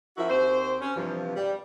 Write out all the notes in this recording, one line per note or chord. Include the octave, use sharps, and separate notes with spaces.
F3 C#4 E4 F#4 A#4 E5
D#2 C4 F#4 C5
C#4
G2 C3 E3 F3
G3